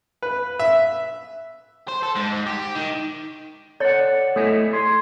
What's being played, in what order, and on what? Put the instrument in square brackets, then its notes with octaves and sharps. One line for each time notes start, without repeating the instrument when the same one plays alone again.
[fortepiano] B4
E5
[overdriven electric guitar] C5
A4
G#2
G4
D#3
[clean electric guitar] A4 F#5 [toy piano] C#5 D5
[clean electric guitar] A3 E4 D#5 [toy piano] A4 G#5
[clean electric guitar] G#4 C6